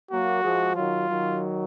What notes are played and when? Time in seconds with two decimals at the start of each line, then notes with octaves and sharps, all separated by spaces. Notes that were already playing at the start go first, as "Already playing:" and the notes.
0.11 F#3 A#3 F#4
0.44 F3 G#3
0.75 D#3 F#3 F4
1.09 D#3 F#3